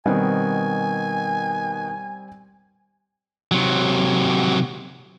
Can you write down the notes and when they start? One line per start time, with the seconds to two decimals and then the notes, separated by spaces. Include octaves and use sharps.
0.06 B2 D#3 G3 C4 G#5
3.52 C3 F#3